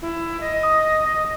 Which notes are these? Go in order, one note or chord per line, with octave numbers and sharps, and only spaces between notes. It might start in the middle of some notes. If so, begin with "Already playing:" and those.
E4
D#5
D#6